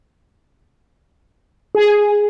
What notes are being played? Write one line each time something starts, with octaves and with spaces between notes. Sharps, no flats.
G#4